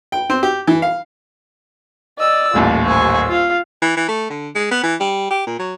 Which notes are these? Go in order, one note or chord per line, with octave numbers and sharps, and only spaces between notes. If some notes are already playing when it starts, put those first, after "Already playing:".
G5
C4
G4
E3
F5
D5 D#5 E6
D#1 A1 D#2 F4
C5 G#5 C#6 E6
F4 F5
E3
E3
A3
D3
G#3
B3
E3
G3
G4
A#2
F#3